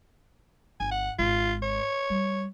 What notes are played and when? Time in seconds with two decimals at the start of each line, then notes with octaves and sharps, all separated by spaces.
0.80 G1 G#5
0.92 F#5
1.19 G#1 F4
1.63 C#5
2.10 G3